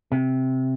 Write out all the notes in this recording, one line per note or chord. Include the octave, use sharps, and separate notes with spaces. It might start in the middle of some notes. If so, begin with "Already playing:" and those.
C3